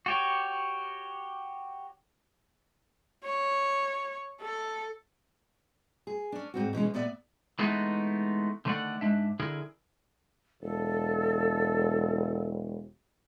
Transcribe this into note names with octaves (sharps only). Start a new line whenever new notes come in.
F#4 G4 C#5
C#5
A4
G#4
C#4 D4
G#2 C4 F#4
B2 E3 G#3 C#4
A#2 B3 D5 E5
E3 G#3 A3 B3 D#4
D3 D#3 A3 B4 D5 F#5
G#2 G#3 D4 E5
D3 E4 G#4 A#4
E1 A4